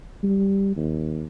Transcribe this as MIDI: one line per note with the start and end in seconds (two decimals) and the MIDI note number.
0.23 0.72 55
0.77 1.24 39